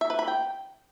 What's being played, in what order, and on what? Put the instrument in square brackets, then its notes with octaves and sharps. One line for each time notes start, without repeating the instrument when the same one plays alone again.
[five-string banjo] E5
B4
B5
G5